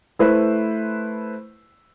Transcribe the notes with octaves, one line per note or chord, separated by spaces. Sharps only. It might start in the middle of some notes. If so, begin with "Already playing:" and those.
A3 E4 B4 C5